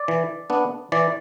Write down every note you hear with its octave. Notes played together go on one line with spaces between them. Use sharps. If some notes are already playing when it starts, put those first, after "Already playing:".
Already playing: D5
E3
B3 D4
E3 D5